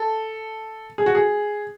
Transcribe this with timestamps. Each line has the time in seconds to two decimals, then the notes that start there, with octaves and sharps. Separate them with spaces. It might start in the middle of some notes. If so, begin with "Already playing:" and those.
Already playing: A4
0.98 G#4
1.06 F#4
1.15 G#4